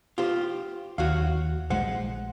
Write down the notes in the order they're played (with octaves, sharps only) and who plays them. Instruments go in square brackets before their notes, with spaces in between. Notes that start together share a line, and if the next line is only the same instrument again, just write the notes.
[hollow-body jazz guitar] F4 G4 C5
[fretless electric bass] D#2 [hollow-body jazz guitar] F#4 C#5 F5
[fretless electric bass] A#1 G#3 [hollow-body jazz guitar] C5 F#5